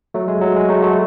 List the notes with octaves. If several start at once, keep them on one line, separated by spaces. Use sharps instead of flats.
F#3 A3
G#3
F#3
G#3
F#3 A3
F#3 A3